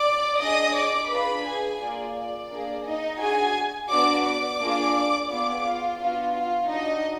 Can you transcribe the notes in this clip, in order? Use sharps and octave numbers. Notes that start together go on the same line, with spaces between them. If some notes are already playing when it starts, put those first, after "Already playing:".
Already playing: D5 D6
D4 G#4 D#5 D#6
D5 D6
D4 F4 G#4 B4 B5
G#4 G#5
A#3 F4 G#4 D5
D5
A#3 D4 G#4
D#4 D#5
D4 F#4 G#4 G#5
B3 D4 F#4 D5 D6
D5 D6
A#3 D4 F4 G#4
B3 F4 G#4 D5 D6
F4 F5
B3 D4 F4 F#4 F5
F4 F5
D4 D#4 F#4 D#5